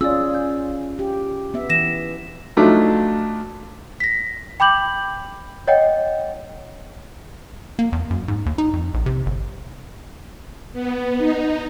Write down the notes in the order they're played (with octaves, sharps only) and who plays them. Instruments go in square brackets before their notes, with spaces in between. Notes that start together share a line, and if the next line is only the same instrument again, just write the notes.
[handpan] C#4 F4 G#4 [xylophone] D5 E6
[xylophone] G6
[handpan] G4
B3 E5
[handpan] E3 [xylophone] A#6 E7
[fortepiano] F3 F#3 A3 D4 D#4 F4
[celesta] A#6 B6
G5 B5 D6 G6 F#7
C#5 D#5 F#5 G5
[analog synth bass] A#3
E2
F#2
G#2
D#2
D#4
F2
A#1
C3
G1
[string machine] B3
D#4